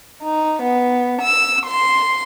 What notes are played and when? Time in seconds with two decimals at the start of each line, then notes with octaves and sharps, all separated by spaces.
0.22 D#4
0.63 B3
1.21 E6
1.66 C6